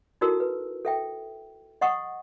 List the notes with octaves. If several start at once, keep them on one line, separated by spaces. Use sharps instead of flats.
D#4 E4 F#4 A4 A#4 E6
B4
A4 E5 G5
D#5 F#5 C#6 D#6